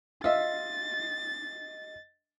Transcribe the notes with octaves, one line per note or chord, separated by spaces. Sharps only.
F4 D#5 E5 A6